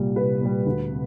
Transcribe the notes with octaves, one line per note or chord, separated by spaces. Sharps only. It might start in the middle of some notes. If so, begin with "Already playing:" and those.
Already playing: C2 A#2 G3
C2 B4
A#2 G3
D2
C3